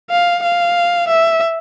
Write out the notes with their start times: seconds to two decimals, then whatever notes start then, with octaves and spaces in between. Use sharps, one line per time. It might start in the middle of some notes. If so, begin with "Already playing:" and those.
0.10 F5
0.43 F5
1.08 E5